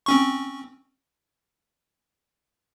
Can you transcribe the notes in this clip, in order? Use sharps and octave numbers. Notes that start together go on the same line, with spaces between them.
C4 C#4 C#6